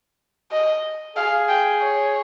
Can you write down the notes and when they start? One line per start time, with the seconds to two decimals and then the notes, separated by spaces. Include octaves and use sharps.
0.51 D#5
1.16 G#4 F5
1.49 G5
1.81 C#5